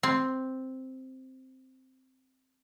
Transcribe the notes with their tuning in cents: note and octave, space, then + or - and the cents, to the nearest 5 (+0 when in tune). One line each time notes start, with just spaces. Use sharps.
C4 +0